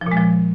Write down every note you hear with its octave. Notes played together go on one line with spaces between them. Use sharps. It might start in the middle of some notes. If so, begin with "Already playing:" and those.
F3
A#2
G#3
F3